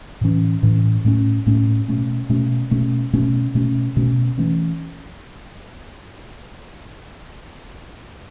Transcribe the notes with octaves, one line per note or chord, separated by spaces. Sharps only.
A2 E3 C#4
A2 E3 C#4
A2 A3 C#4
A2 A3 C#4
B2 A3 C#4
B2 A3 C#4
B2 A3 C#4
B2 A3 C#4
B2 A3 C#4
B2 A3 C#4
E3 A3 C#4